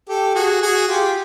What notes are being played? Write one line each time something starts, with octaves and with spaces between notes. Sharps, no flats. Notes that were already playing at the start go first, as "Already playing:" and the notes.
G4 A4
F#4 G#4
F#4 G#4
F4 G4